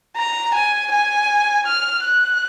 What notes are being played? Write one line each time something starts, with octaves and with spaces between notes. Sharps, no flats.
A#5
G#5
G#5
F6
F#6